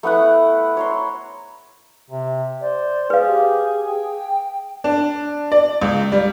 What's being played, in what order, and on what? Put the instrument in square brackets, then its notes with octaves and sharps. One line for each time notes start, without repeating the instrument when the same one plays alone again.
[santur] A3 B3 E4 F#5
C#5 A#5 C6
[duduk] C3
[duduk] C5 [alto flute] D5
[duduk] G#4 [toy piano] B4 F5
[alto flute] G4
G5
[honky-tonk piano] D4
D5
C#2
G3